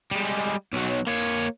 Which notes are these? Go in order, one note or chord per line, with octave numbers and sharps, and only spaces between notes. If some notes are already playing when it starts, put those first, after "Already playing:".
G3 G#3
B1 F#3
A#3 C#5